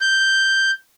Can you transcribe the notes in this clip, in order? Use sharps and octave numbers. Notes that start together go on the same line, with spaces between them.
G6